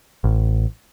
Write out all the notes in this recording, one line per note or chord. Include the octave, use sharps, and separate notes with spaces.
A1